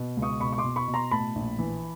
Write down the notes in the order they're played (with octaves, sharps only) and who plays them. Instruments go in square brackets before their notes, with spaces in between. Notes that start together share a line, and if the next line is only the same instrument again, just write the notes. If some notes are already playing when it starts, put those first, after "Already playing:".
Already playing: [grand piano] B2
C#2
C#6 D#6
B2 B5 C#6
C#6
C6 D6
B2
B5 C#6
B2
A#5 C6
A2 A5 B5
A#1
E3